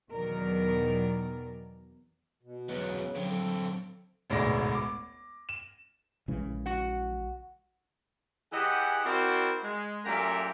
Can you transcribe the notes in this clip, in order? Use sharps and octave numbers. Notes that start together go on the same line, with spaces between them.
E2 B2 D#3 F#3 A#4 D5
B2
E2 C#3 F#3 B4
D3 F#3 C4
A4
E1 A1 D2 G#2 D5 A#6
D6
E7
A#1 C#3 E3 G#3
F#4 F#5
E3 G4 G#4 D#5 F#5
C4 E4 F#4 A#4 C5 D5
G#3
F#2 A#2 A3 G4 E5 A#5